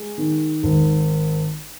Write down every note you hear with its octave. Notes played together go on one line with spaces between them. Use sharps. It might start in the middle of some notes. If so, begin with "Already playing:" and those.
Already playing: G#3
D#3
G#1